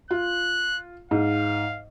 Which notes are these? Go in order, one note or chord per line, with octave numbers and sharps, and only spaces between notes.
F4 F#6
G#2 F5